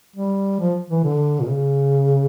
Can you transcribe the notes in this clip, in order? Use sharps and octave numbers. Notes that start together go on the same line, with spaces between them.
G3
F3
E3
D3
A#2
C#3